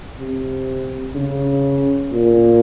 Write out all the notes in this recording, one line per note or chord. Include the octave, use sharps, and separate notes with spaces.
C3
C#3
A#2